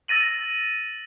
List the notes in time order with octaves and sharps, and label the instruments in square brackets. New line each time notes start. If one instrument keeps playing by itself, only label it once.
[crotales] E6 A6 A#6 D#7 F#7